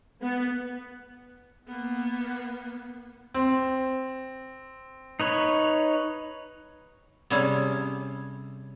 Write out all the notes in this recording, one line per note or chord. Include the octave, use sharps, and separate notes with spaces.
B3
A#3 B3
C4
D#4 B4 C#5
C3 G3 C#4 G#4 A4